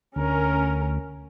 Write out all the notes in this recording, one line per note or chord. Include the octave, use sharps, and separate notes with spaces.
D2 C#4 A#4